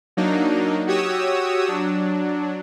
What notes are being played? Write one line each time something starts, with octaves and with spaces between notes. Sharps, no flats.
F#3 A#3 D4 D#4
F#4 G4 C#5 D#6 E6
F#3 D4